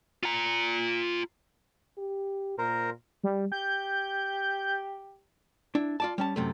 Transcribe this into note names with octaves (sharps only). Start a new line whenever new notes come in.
F4 A#5
G4
A#2 A#4 C5 A#5
G3
G4 G6
D4 E4
F4 D5 A5
G3 C#4 A5
F#2 C3 A3